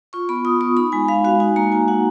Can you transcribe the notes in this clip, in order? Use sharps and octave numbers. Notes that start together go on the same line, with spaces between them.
F4 C#6
B3 B5
F4 D#6
B3 C#6
D#4 B5
G#3 G#5
G#3 F5
F#4 F5
D#4 G#5
A#3 A#5
A#3 G#5
F#4 F#5